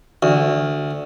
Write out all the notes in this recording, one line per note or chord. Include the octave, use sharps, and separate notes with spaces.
D2